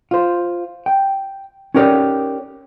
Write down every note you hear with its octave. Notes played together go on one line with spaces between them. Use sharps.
F4 C5
G5
C#4 D#4 G4 A#4 C#5 D5